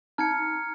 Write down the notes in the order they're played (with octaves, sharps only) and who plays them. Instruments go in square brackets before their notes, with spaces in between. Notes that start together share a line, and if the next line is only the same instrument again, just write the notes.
[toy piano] D#4 [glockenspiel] A#5 F6 G#6 C#7